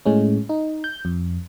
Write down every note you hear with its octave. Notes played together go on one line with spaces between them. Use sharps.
A2 G#3 C#4
D#4
G6
F2